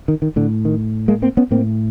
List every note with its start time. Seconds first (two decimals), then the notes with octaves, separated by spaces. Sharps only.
0.08 D#3
0.22 D#3
0.36 A2 D3
0.65 D#3
1.08 G#3 A#3
1.22 A#3 C4
1.37 B3 C#4
1.51 A2 A#3 C4